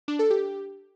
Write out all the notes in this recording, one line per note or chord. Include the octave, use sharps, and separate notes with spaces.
D4
A4
G4